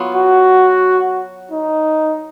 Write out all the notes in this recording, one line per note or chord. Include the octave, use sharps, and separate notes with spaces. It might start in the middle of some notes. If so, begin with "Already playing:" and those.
Already playing: F#3 B3 F4
F#4
D#4